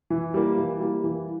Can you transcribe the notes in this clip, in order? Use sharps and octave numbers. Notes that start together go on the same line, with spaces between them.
E3
G3 A#3
E3
G3 A#3
E3